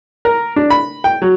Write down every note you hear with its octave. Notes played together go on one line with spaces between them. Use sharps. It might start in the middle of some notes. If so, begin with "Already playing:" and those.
A#4
D4
B5
G5
F#3